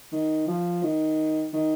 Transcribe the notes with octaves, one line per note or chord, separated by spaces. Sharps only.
D#3
F3
D#3
D#3